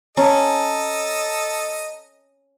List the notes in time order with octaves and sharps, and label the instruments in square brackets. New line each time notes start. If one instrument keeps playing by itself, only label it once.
[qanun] C#4 [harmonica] A4 D#5 [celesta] A5 A#5